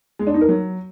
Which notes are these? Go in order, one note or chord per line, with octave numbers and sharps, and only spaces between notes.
G#3
D4
D#4
A#4
F#3